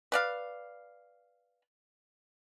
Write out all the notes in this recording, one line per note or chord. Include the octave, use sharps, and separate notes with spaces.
B4 D5 F5